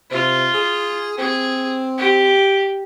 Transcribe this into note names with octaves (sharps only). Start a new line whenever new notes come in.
C3 F4
G#4
C4 G#4
G4